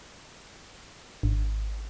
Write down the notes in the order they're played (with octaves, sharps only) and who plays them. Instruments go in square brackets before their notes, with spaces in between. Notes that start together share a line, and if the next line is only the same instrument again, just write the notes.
[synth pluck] G#1